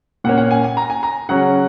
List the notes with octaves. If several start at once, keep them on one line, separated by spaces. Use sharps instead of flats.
A#2 A#3 C#4 F#5
F#5
G#5
G#5
A#5
G#5
A#5
C#3 F#3 C#4 F#5